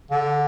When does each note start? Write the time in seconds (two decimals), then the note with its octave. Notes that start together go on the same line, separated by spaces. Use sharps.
0.11 D3